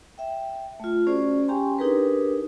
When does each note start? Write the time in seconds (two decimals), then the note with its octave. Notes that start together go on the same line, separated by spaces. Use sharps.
0.18 E5 G5
0.80 A3 F4
1.07 C#4 F#4 G#4 C5 D5
1.48 C#4 G4 G5 G#5 A#5 C6
1.79 D4 D#4 G4 G#4 A#4 B4